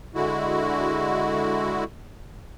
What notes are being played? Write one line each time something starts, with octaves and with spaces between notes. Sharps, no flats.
D3 G#3 E4 F#4